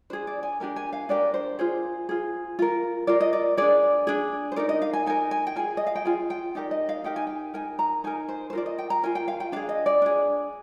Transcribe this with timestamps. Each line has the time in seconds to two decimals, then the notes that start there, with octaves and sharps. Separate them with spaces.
0.10 D4 G#4 C5
0.27 D5
0.43 G#5
0.60 D4 G4 A#4 G#5
0.76 G#5
0.93 F5
1.09 D4 G4 A#4 D5
1.34 C5
1.59 F4 G#4 C5
2.09 F4 G#4
2.59 F4 A#4
3.07 F4 A#4 D5
3.21 D#5
3.33 D5
3.57 D4 G#4 D5
4.07 D4 G#4
4.52 C5
4.56 D#4 A#4 D5
4.69 D#5
4.82 F5
4.93 G#5
5.06 D#4 A#4 G#5
5.31 G#5
5.47 G5
5.56 F4 G#4 G#5
5.77 D#5
5.87 F5
5.95 G5
6.05 F4 G#4 G#5
6.30 G5
6.55 D#4 G4 A#4 D5
6.71 D#5
6.89 F5
7.04 D#4 G4 A#4 G5
7.16 G#5
7.27 G5
7.54 D#4 A#4 G#5
7.79 A#5
8.04 D#4 A#4 G#5
8.29 C5
8.50 C5
8.53 F4 A#4 D5
8.66 D#5
8.78 G5
8.90 A#5
9.03 F4 A#4 G#5
9.15 G5
9.28 F5
9.40 G5
9.52 D4 G#4 F5
9.69 D#5
9.86 D5
10.02 D4 G#4